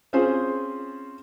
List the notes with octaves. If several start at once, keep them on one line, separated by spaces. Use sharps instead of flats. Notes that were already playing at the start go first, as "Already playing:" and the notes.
C4 C#4 F4 G#4 C5